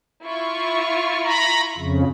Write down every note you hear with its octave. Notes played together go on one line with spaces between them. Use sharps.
E4 F4 C#6
A#5 B5
F2 C#3